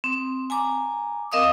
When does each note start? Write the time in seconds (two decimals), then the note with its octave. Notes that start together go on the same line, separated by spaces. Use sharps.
0.04 C4
0.50 G#5 A#5 D6
1.32 C4 A#4 D#5 F5 D6 D#6